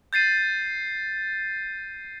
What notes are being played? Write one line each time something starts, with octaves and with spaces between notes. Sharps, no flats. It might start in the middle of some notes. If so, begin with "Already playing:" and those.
G6 A6 C7 D#7